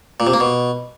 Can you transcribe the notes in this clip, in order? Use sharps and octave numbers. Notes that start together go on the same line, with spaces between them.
A#2
C3
A#3
B2